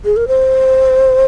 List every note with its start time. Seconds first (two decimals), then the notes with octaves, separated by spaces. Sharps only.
0.05 G#4
0.17 A#4
0.28 C5